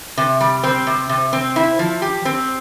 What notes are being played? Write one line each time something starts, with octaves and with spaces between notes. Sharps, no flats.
C3
G3
C4
C3
C3
C4
E4
F3
G4
C4